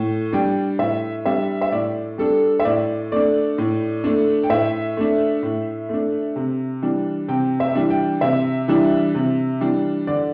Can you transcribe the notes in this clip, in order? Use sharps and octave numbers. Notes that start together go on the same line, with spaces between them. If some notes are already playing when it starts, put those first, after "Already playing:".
Already playing: A2
G3 D4 G5
A2 E5
G3 D4 E5
E5
A2 D5
G3 D4 A4
E5
A2 D5
A3 D4 D5
A2
A3 D4
G5
A2 E5
A3 D4
A2
A3 D4
C3
E3 G3 D4
C3 G5
E5
E3 G3 D4
G5
C3 E5
E3 G3 D4
C3
E3 G3 D4
D3 D5